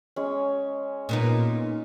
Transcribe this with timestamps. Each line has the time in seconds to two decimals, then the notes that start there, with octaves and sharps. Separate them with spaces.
0.16 G#3 C#4
1.09 A#2 B3 D#4